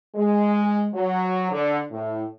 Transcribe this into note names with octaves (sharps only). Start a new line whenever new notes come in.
G#3
F#3
D3
A2